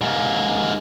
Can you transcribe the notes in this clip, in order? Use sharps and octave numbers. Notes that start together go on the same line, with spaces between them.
G#2 A#3